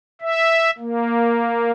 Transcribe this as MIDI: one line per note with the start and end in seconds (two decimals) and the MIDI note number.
0.21 0.70 76
0.78 1.71 58